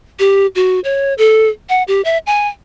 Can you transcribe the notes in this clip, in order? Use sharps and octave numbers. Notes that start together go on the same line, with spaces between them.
G4
F#4
C#5
A4
F#5
G4
E5
G#5